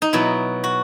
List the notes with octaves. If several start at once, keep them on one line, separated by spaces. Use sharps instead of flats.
D#4
B2 F#3 E4
F#4